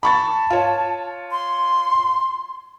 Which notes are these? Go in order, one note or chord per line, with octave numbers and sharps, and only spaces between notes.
A5 B5 C#6 A6
F4 C#5
C6